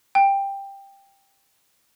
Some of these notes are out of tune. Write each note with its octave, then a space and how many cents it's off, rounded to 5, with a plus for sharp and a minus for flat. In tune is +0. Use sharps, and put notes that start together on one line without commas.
G5 +10